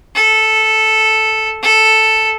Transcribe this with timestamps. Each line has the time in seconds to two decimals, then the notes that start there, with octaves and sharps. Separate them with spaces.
0.15 A4
1.63 A4